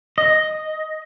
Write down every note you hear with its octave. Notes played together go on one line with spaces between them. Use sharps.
D#5